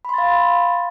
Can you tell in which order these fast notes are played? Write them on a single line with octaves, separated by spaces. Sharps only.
B5 C6 A6 F5